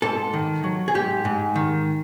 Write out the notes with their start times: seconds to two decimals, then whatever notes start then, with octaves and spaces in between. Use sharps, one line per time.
0.02 G#2 A4
0.33 D#3
0.64 F#3
0.88 G#4
0.94 G#2 G4
1.25 G#2
1.56 D#3